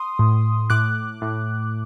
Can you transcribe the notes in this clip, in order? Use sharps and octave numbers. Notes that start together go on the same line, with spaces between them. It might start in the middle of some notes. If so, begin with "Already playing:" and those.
Already playing: C6 D#6
A2
A2 D6 F#6
A2